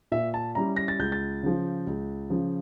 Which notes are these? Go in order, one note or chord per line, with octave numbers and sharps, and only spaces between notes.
A#2 E5
A5
G3 C#4 E4 A#5
A#6
A6
C#2 G6
A6
C#3 F3
C#2
C#3 F3